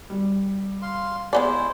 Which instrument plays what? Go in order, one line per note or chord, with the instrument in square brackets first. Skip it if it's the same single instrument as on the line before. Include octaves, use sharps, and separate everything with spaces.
[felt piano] G3
[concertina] F5 C6
[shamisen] G#3 B3 D5 [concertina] E4 C5 [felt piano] G#5